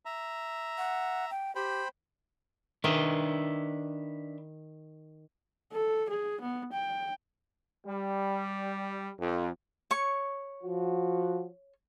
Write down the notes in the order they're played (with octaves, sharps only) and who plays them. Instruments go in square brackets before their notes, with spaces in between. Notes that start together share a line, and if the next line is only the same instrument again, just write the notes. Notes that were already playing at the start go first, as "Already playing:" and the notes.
[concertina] E5 A#5
[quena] F#5
G5
[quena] G4 [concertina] C5 G5 B5
[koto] D#3 [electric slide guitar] D4 B4 E5
[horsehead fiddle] A4
G#4
B3
G5
[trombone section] G3
F2
[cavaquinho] C#5 C#6
[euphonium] F3 [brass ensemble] F#4